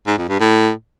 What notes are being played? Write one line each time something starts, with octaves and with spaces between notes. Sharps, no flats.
G#2
F2
G2
A2